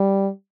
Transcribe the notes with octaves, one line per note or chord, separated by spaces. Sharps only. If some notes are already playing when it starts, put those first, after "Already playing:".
Already playing: G3